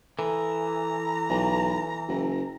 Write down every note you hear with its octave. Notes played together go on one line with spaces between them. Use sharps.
E3 A4 A#5
B1
F#1